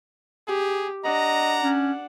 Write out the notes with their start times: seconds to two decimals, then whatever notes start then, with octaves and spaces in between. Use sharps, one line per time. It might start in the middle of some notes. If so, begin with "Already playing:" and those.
0.48 G4 G#4
1.05 D4 D#5 F#5 A#5
1.62 C#4